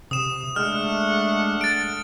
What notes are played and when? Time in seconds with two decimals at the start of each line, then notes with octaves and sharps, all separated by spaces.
0.11 C3 D#6 E7
0.56 G#3 A3 D4 F#5 F6
1.61 A6 D7